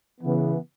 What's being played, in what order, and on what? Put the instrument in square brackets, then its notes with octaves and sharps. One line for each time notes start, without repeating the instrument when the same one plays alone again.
[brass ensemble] C#3 E3 B3